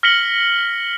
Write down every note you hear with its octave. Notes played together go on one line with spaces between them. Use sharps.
F6 A#6 B6 C#7 F#7 G7